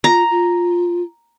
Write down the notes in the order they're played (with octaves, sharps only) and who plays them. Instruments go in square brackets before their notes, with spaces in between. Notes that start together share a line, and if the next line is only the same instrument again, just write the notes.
[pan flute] F4 [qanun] A#5
[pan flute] F4